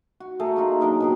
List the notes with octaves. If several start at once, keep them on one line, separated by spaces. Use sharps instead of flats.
F#4
A3 G#4 A#4
A#3 D#4 F4 G#4
F#3 D4 A#4 D#5
B2 D#3 G#4